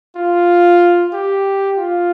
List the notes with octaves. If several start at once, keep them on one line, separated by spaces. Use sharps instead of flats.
F4
G4
F4